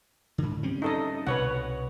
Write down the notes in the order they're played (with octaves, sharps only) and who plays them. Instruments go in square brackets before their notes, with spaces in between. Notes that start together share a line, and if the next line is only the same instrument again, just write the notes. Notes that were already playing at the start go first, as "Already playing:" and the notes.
[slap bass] G#2 D3
G3 C4 C#4
[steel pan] D#4 A4 D#5
[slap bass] C2 B2 [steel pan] B4 C#5 F#5